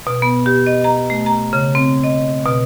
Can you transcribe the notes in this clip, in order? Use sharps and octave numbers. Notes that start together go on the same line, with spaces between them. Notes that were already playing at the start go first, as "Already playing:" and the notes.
B2
B3
G4
D#5
A#5
A3
A#5
C#3
C4
D#5
B2